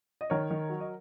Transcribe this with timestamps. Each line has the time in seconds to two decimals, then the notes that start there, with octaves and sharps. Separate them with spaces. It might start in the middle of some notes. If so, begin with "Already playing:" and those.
0.21 D#5
0.30 D#3 A#4 C#5
0.50 D#3
0.69 F#3
0.80 D#5